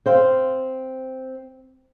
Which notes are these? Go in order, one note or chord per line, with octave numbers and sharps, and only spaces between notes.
C4 C5 F5